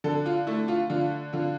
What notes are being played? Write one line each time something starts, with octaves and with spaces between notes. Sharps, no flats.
D3 A4
F4
A3 E4
F4
D3 F4
D3 F4